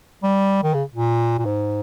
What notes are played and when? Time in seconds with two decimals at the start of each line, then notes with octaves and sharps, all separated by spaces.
0.23 G3
0.63 D#3
0.74 C#3
0.94 A#2
1.38 A#2
1.45 G#2